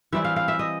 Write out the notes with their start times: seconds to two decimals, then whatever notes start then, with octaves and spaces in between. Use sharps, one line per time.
0.12 E3 G3 C4 E4 E5
0.24 F5
0.36 F5
0.48 E5
0.59 D#5